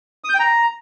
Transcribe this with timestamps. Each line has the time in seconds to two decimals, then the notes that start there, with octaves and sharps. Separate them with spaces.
0.24 D#6
0.29 G6
0.34 G5
0.39 A#5